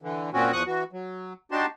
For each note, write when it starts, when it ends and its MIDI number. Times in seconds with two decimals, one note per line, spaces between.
0.02 0.30 50
0.02 0.30 52
0.33 0.52 46
0.33 0.52 60
0.33 0.52 61
0.33 0.52 66
0.53 0.63 40
0.53 0.63 53
0.53 0.63 85
0.53 0.63 87
0.53 0.63 90
0.67 0.84 52
0.67 0.84 66
0.93 1.33 54
1.52 1.66 62
1.52 1.66 63
1.52 1.66 66
1.52 1.66 67
1.52 1.66 81
1.52 1.66 84